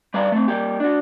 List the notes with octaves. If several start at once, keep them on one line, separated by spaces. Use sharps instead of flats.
G3 B4 D5 F5 A#5
A3 C4
G3 A#3 G4
D4 F#4